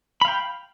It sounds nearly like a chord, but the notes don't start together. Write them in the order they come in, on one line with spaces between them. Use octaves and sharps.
B5 F5 G5